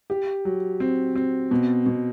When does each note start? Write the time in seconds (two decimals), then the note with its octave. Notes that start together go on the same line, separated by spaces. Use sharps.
0.10 G4
0.45 F#3
0.80 C4
1.15 C4
1.51 B2
1.86 B2